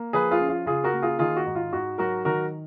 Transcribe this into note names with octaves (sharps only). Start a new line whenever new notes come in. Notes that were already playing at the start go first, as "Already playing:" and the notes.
Already playing: A#3
F3 G#4 B4
F4 G#4
C#4
F4
C#3 F4 G#4
F#4 A#4
A#3
F4 G#4
D#3 F4 G#4
F#4
G#2
F4
G#2 F#4
F#3 F#4 A#4
D#3 F#4 A#4